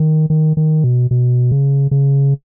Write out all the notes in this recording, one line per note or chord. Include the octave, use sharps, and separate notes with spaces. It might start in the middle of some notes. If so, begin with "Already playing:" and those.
Already playing: D#3
D#3
D#3
B2
B2
C#3
C#3